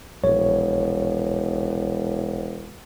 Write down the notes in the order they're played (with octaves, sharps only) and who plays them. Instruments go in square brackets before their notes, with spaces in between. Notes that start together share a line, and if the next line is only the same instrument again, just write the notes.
[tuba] E1 [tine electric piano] A#1 C#5